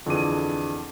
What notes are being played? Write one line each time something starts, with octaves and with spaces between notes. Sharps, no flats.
F2 D3 E3 G#4 D6 D#7